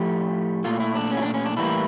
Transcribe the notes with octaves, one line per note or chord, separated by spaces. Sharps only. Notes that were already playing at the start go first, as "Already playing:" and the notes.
Already playing: A2 F3 A3 G4
A#2 A3 F4
E4
D4
C#4
E4
D4
C#4
D4
A2 E3 G3 A#3 E4